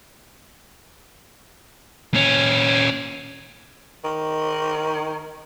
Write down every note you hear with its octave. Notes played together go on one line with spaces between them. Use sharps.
A#2 C#4
D#3